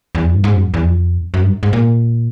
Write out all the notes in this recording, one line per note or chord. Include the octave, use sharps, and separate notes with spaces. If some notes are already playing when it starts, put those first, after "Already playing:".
E2
F2
G2
G#2
F#2
F2
E2
F2
F#2
G2
G#2
A#2